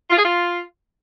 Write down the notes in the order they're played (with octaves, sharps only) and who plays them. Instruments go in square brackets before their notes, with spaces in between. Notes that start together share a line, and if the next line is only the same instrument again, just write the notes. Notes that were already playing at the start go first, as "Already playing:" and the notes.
[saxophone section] F4
G#4
F4